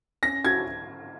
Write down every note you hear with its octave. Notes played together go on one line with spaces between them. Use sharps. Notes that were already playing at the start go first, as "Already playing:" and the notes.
C#4 A#6
F#4 G#6